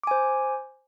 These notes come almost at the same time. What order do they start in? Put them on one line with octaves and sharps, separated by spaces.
D6 G#5 C5